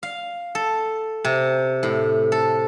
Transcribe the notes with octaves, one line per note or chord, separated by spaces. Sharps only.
F5
A4
C3
A2
A4